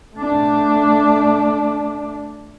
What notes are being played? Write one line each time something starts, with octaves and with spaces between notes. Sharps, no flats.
A3 D4